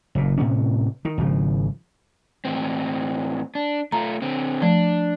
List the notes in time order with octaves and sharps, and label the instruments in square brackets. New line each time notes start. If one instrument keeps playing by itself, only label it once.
[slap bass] F#1 A#2
A2 C3 C#4
D#3
G#1 C#3 F3
[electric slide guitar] A2 E3 C4
D4
[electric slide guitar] A3 F4 [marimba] A#5
[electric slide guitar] D3 C4
[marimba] F3 A3 [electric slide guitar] D4